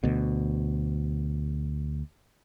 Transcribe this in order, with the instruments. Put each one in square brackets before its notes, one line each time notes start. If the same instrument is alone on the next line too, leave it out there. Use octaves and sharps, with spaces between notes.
[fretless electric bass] D2 B2